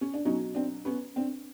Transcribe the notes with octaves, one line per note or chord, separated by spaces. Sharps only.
C#4
D4
B2 F#3 C#4 D#4
C4 D4
B3 C#4
C4 D4